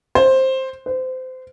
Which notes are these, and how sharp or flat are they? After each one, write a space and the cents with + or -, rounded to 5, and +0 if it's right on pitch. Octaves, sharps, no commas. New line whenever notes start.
C5 +10
C5 -25